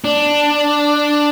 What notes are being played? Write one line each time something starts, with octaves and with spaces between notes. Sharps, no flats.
D4